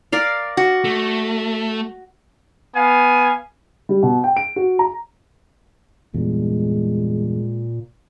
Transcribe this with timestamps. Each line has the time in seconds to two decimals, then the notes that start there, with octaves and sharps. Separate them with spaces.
0.12 A#4 D5 F5
0.57 F#4
0.84 A3
2.75 B3 F5 G#5
3.89 G3
4.03 B2
4.24 G5
4.37 D7
4.56 F#4
4.79 A#5
6.14 E2 G2 A#2 G#3